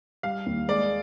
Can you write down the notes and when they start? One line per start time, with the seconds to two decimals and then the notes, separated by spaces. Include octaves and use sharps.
0.23 G3 F5
0.46 D#2
0.68 G#3 D5